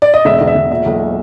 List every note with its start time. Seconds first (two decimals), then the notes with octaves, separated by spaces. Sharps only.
0.02 D5
0.14 D#5
0.25 E1 E5
0.41 E1
0.47 E5
0.55 E1
0.70 A#2 E5
0.85 B1